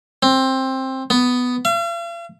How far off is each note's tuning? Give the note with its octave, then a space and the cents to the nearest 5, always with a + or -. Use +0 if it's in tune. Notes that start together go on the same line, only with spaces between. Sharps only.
C4 +15
B3 +5
F5 -45